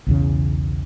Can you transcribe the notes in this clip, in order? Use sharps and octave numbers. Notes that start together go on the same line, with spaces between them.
B1 E2 C#3